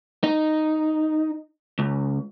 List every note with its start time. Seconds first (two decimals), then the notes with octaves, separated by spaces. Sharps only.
0.24 D#4
1.79 C#2